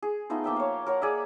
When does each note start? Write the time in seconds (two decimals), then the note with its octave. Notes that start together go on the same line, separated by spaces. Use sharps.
0.02 G#4
0.30 A3 B3 D#4 F4
0.44 F3 A#3 E5 G5
0.56 C#5 F5
0.86 A#4 C#5 F#5
1.02 G#4 D5 E5